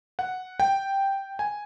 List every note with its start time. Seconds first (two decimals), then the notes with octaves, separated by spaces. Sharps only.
0.19 F#5
0.60 G5
1.39 G#5